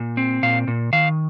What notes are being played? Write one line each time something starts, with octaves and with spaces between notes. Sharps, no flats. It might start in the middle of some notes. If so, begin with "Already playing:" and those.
Already playing: A#2
C4
A#2 F5
A#2
D#3 F5